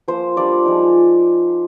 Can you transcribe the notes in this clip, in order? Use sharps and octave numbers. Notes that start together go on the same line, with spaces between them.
F3 A#3 F4 C5
G3 D4 F4 D5
F3 G#3 D#4